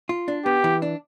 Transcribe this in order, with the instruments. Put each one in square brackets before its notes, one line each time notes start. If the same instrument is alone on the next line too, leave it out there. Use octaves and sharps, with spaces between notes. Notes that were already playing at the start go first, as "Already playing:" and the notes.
[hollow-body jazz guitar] F4
D4
[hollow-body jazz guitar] B3 [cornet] G4
[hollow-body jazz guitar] E3
D4